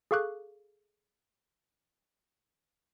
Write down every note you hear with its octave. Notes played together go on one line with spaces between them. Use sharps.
G#4 A4 F5 C#6 D6 F#6